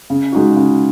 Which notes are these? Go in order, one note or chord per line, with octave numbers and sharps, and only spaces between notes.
C#3
G#3 D#4 F#4
C#3